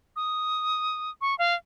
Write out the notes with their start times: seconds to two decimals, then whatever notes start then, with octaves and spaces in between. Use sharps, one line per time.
0.16 D#6
1.21 C#6
1.38 F5